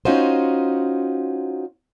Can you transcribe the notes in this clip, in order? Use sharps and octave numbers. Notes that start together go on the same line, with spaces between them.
C#4 D#4 F4 F#4 C5